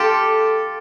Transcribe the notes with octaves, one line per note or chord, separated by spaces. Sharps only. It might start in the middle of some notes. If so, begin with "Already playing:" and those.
Already playing: F4 G4 A4